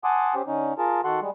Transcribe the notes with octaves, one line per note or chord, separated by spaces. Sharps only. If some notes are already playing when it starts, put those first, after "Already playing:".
F#5 G#5 A5 C6 D6 D#6
C#4 G4 C5
D3 C#4 D#4
F4 G#4 A#4 A5
D#3 F#4 A4 F#5 C6
G3 G#3